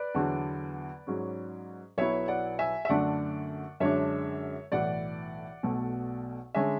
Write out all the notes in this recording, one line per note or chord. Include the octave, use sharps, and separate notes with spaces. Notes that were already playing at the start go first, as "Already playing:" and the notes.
Already playing: B4 D5
E2 D3 F#3 B3 D4
G#2 F#3 C#4
B1 B2 F#3 B3 E4 C#5 E5
D5 F#5
E5 G#5
E5
F#2 D3 A3 D4 D5 F#5
F#2 D3 G#3 D4 C#5 E5
B1 A2 E3 D5 F#5
B1 B2 A3
D3 G#3 C#4 E5 G#5